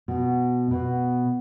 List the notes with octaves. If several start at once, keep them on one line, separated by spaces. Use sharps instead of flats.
B2
B2